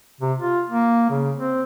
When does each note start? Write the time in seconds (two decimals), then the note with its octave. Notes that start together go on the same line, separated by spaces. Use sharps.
0.21 C3
0.38 F4
0.70 A#3
1.10 C#3
1.36 C4